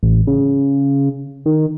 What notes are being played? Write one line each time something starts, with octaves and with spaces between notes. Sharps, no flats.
A1
C#3
D#3